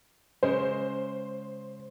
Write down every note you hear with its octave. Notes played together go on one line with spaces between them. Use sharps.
C#3 G#3 C5